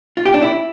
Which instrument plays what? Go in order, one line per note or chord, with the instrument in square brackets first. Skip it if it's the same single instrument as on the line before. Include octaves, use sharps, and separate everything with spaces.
[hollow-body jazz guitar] F4
G4
D4
E4